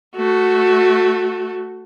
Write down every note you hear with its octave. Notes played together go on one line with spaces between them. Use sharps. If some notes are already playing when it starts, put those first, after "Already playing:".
A3 F#4